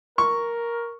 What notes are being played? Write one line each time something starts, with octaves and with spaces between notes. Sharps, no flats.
A#4 C#6